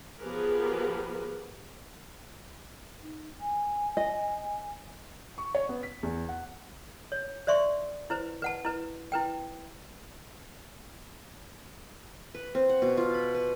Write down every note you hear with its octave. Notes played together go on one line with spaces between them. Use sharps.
F3 B3 G4 G#4 A#4 B4
D#4
G#5
D#5
C#6
C#5
B3
B6
E2
F#5
C#5
C5 D5 E5 C6 C#6
E4 B4 C5
B4 F#5 A5
E4 B4
E4 B4 G5
B4
C4
F#5
B2
F4
B5
B4